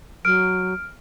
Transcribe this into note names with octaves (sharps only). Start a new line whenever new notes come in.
F#3 F6 D7